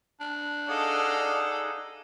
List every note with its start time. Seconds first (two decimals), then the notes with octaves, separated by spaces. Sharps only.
0.20 D4
0.68 D#4 G#4 A4 D5 D#5 F5 F#5